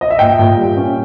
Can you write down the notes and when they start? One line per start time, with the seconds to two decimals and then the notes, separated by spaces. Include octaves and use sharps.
0.01 D#5
0.10 E5
0.19 A#2 G5
0.39 A#2
0.57 G3
0.77 C#4